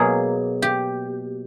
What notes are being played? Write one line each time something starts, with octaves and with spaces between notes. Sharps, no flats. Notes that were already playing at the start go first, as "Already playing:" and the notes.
Already playing: B2 F#3 A#3 G#4
G4